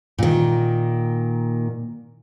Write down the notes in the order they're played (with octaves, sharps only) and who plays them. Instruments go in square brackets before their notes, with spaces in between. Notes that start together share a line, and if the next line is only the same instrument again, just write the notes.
[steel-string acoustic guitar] A#2 D#3